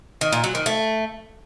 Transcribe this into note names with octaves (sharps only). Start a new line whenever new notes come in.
D#3
A#2
F#3
D#3
A3